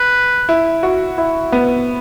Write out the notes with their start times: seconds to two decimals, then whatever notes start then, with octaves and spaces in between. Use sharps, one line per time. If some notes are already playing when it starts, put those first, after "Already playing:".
Already playing: B4
0.49 E4
0.83 F#4
1.18 E4
1.52 B3